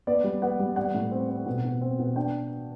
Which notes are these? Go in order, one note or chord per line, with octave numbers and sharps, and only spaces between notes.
B3 D5
G3
B3 F#5
G3
G3 F#5
A2
C4
C4
B2
B2
C4
B2
D4 G5